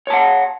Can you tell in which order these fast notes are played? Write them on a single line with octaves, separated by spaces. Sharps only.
C#5 A5 F#5